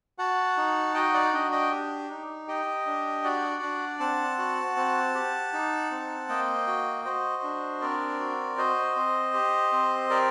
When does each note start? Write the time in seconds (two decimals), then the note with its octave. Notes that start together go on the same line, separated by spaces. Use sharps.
0.18 F#4 F#5 A5
0.57 D#4
0.95 F#4 D#5 G5
1.14 D5 F#5
1.33 D4 D#5 G5
1.52 D#5 G5
1.71 G4
2.10 D#4
2.48 G4 D#5 G5
2.86 D4
3.24 F#4 D5 F#5
3.62 D4
4.00 C4 F#5 A5
4.38 F#4
4.76 C4
5.15 G4
5.53 D#4
5.91 C4
6.29 A#3 D#5 G5
6.67 F#4
7.05 F#4 C5 D#5
7.43 D4
7.81 C4 A#4 D5
8.20 F#4
8.58 F#4 C5 D#5
8.96 C4
9.34 G4
9.72 C4
10.10 G4 A#4 D5